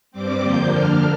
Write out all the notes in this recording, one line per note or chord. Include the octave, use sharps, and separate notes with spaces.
G2 G3 C4 D6
F2 D3 F3 A#3 G6
D3 A#3 D4 F6